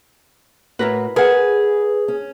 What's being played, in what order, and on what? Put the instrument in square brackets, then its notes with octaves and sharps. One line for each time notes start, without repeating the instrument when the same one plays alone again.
[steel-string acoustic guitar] A2 F#4 [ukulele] E4 A#4 B4
[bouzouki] G#4 [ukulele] A#4 F#5 [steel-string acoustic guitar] B4
[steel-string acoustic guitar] C#4